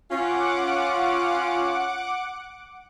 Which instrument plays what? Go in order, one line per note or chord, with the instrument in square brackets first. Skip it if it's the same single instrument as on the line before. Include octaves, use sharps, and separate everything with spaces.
[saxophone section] C#4 F4 [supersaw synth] F#5 D6